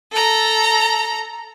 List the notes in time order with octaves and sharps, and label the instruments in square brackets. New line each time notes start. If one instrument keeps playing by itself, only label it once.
[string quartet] A4 A#5